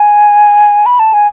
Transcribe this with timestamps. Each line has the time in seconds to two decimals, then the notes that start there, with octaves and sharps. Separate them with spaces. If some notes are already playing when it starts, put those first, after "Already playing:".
Already playing: G#5
0.86 B5
0.99 A5
1.13 G#5